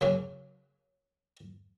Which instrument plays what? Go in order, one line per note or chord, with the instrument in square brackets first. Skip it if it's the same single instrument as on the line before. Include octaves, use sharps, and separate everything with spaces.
[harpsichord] C#3 F#3 A#3 C#4 F#4